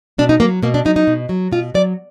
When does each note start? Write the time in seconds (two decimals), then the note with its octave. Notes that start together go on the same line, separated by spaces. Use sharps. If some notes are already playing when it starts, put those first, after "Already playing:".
0.18 B2 D4
0.29 D#4
0.40 F#3 A#3
0.63 B2 A#3
0.74 D4
0.85 F#3 D#4
0.96 D#4
1.07 B2
1.29 F#3
1.52 B2 F4
1.74 F#3 D5